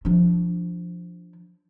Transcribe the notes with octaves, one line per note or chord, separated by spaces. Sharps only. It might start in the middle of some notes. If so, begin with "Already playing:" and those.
F3 D4